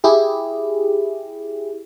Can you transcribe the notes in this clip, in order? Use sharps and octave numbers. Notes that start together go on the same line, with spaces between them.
E4 G4 G#4